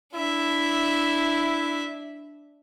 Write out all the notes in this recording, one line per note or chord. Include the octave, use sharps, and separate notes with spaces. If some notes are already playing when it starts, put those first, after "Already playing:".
D4 E4 E5